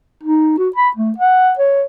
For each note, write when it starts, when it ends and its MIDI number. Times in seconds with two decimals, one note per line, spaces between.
0.23 0.56 63
0.59 0.69 66
0.76 0.89 83
0.96 1.12 57
1.18 1.53 78
1.59 1.85 73